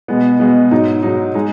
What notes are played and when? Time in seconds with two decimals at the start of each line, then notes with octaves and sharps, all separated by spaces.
0.08 B2 G#3 B3
0.40 B2 G#3 B3
0.71 G#2 F#3 D#4
1.03 G#2 F#3 D#4
1.34 G#3 D#4